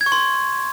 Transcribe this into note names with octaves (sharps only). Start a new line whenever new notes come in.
G#6
C#6
C6